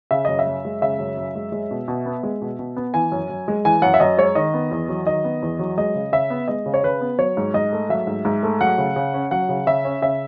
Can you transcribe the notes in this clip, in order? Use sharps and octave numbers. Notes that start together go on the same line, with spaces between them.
C#3 E5
F#2 D#5
E5
F#2
G#3
C#3 E5
F#2
F#2
G#3
G#3
B2
B2
B3
G#3
B2
B2
B3
E3 G#5
F#2
F#2
G#3
E3 G#5
F#2 F#5
E5
F#2 D#5
G#3 C#5
D#3 D#5
B3
E2
F#3
D#3 D#5
B3
E2
F#3
G#3 D#5
C#3
C#3 E5
B3
G#3 D#5
C#3
C#5
C#3 B4
B3
F#3 C#5
G#2
G#2 D#5
A3
F#3 E5
G#2
G#2
A3
F#3 F#5
C#3
C#3
C#4
F#3 F#5
C#3
C#3 E5
C#4
C#3 E5